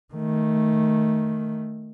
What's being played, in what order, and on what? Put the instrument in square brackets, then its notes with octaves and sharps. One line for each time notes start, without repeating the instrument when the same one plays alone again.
[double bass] D#3 A3